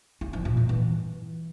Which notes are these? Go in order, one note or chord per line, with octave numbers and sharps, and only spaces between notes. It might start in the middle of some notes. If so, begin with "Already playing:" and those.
E4
F3
A#2
F3
E3